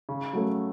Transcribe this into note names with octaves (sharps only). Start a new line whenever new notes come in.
C#3
F#3 A3 C#4 A4